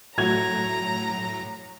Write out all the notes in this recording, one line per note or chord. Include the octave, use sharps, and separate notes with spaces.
A2 F#3 A3 F#4 A#5 G#6 F7